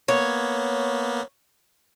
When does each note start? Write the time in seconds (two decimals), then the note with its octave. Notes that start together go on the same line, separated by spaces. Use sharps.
0.08 A#3 B3 C#5